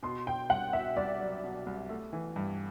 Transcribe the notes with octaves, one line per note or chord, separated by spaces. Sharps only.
B2 C6
B2 G5
C2 F#5
B2 E5
C2 D5
F#3
B2
C2
A3
E3
G2